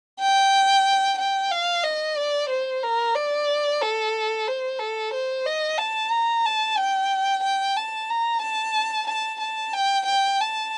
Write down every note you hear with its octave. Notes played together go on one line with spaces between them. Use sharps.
G5
G5
F5
D#5
D5
C5
A#4
D5
A4
C5
A4
C5
D#5
A5
A#5
A5
G5
G5
A5
A#5
A5
A5
A5
G5
G5
A5